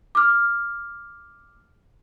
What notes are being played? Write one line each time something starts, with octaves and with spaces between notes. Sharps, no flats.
D6 F6